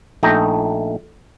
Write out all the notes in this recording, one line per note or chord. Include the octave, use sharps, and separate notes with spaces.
A#1 A3 D#4 G5 A#5